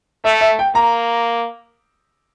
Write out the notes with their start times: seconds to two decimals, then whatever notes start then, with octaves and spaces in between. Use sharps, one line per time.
0.25 A3 E5
0.41 E5
0.59 G5
0.75 A#3 A#5